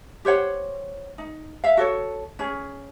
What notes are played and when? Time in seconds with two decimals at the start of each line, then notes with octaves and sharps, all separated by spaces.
0.25 G4 C5 C#5 F#5
1.18 D#4
1.64 E5 F5
1.77 F#4 A4 C#5
2.39 C#4 G#4